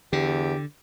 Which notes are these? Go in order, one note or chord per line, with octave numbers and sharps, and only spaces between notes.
E2 D3 G4